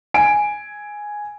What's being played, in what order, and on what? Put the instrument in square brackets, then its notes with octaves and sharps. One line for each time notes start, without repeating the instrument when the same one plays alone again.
[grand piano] G#5 D7